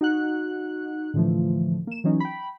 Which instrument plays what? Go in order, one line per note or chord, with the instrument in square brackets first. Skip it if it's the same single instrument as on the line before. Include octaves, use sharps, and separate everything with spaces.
[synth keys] D#4 F#4 F#5 F#6
A2 D3 E3 F3 A3
A#3 E7
E3 F#3 C#4 D#4
G5 B5